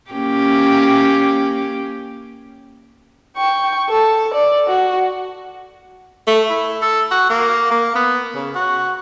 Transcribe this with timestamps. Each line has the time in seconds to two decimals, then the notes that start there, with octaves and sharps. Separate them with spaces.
0.11 A#3 C#4 G4
3.37 G5 C#6
3.89 A4
4.34 D5
4.68 F#4
6.27 A3
6.50 E4
6.82 A4
7.11 F#4
7.30 A#3
7.71 A#3
7.96 B3
8.35 C#3
8.55 F#4